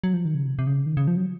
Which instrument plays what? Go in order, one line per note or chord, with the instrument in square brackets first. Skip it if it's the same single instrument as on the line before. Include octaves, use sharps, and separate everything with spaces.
[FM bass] F#3
F3
D#3
C#3
C3
C3
C#3
D#3
C#3
F3
F#3